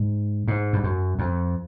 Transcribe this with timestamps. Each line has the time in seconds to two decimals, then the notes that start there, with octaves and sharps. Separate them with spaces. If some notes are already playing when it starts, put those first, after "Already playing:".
Already playing: G#2
0.48 G#2
0.73 G2
0.84 F#2
1.19 F2